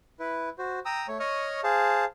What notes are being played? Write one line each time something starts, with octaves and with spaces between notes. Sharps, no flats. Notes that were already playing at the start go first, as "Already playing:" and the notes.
E4 B4
F#4 C5
G5 A#5 D#6 E6
A3 C#5
C#5 D#5 C#6 D#6 F6
G#4 C5 F5 A5